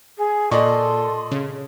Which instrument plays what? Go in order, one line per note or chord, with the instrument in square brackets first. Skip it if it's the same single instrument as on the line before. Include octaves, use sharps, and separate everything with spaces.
[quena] G#4
[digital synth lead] A#2 [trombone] A4 [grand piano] D5 D#5 C#6 [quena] C6
[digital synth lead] C#3